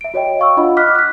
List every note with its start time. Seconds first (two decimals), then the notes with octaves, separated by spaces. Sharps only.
0.01 E5 D7
0.14 F#4 C#5 D#5 G5
0.39 F5 C#6 E6
0.57 D4 F4 D#5 F#5 B5
0.77 D6 F6 F#6 B6
0.95 F#6 B6